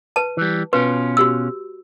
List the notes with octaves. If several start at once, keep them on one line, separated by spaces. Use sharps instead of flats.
B4 A5
E3 G3
B2 C#4 F4 B4
F#4 G4 E6